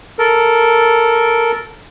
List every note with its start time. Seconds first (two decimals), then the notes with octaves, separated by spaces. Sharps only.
0.19 A4 A#4